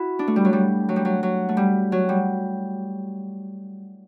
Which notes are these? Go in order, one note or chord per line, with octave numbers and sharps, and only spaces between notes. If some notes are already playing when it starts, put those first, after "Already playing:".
Already playing: E4 F#4
D4
A3
G3
F#3
G3
F#3
G3
F#3
F#3
A3
G3
F#3
G3